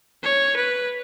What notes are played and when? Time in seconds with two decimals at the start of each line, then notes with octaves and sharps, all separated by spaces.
0.23 C#5
0.57 B4